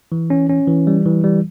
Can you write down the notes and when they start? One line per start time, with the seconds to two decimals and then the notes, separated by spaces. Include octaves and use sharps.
0.12 E3
0.30 C#4
0.49 C#4
0.67 E3
0.87 G3
1.05 E3
1.24 G3